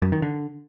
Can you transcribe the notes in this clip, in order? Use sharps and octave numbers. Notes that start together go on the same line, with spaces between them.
F#2
D#3
D3